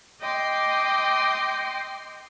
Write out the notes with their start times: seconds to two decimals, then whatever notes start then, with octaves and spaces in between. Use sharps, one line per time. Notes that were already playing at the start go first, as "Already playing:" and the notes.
0.21 D#5 G5 C6 D6